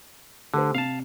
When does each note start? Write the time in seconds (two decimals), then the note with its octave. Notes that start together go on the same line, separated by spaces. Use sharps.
0.54 D3 A3 G4 C5
0.75 C3 F5 A5